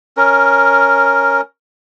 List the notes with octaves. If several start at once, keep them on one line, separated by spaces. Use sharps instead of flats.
C#4 A#4